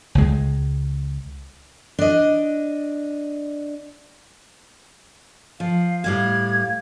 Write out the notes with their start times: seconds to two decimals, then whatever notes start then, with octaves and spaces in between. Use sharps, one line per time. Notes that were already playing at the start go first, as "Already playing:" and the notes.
0.15 C#2 G#3
1.99 D4 D#5
5.60 F3 F5
6.04 A2 G3 F5 G#6